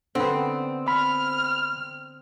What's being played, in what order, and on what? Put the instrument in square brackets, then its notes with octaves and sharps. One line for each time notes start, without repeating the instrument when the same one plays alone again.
[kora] D3 B3 [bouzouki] C4
[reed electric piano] B5 [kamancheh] F6